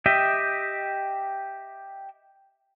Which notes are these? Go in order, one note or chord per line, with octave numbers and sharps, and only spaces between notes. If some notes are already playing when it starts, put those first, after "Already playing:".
G4 D#5 E5 G5